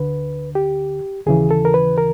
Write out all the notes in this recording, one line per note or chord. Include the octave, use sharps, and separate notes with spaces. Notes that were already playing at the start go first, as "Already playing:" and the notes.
Already playing: D2 D3 B4
G4
D#2 C#3 E3 G#4
A4
A#4
B4
A#4